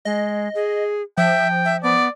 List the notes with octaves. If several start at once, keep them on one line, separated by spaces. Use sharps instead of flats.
G#3 D#5
G#4
F3 E5 G5
E5
B3 D5